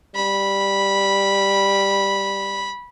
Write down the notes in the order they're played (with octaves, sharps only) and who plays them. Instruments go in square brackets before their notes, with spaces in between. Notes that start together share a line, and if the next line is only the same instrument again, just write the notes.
[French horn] G3 [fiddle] B5